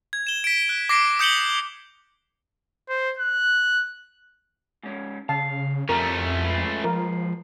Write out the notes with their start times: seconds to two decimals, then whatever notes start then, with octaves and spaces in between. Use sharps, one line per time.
0.13 G#6
0.27 E7 G7
0.44 B6 D7
0.69 F#6
0.89 D6 A#6 C7 D7
1.19 D#6 G6 C#7 F#7 G7
2.89 C5
3.19 F#6
4.83 G#2 C#4
5.29 C#3 F5 A5
5.89 F2 F3 G3 A3 C4 C#4 A#4
6.44 G#3 F4 B4
6.84 F3 A#4